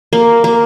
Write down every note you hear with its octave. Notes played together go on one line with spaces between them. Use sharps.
A#3
A#3